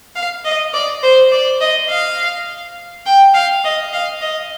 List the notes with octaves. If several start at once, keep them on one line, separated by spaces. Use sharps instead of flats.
F5
D#5
D5
C5
D5
D#5
F5
G5
F5
D#5
F5
D#5